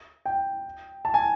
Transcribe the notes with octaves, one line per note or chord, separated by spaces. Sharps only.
G5
A5
G#5